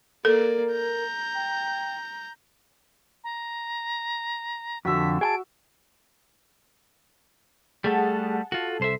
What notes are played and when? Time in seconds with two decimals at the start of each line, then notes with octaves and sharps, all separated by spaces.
0.25 A#3 A4 A#4 D5
0.72 A#5 G6
1.35 G5
3.24 A#5
4.85 F2 D3 F#4 E5 B6
5.21 G#4 G5 A5 D7
7.84 G3 A3 G#4 A4 F#5 A5
8.52 F4 F#4 A4
8.80 C2 C5 E5